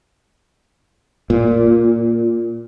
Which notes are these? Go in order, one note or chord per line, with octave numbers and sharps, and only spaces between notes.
A#2